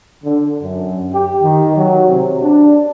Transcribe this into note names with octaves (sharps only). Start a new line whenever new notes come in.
D3
F#2
G4
D#3
F#3
C3
D4